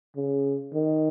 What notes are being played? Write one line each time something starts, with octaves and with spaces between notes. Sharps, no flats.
C#3
D#3